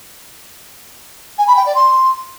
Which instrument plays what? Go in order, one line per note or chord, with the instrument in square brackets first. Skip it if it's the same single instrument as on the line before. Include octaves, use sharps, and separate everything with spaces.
[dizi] G#5
B5
G5
D5
C6